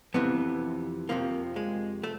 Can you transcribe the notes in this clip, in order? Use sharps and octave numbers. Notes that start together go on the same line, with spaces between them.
F2 C3 E3 B3
F2 C3 F3 A#3
G#3
A3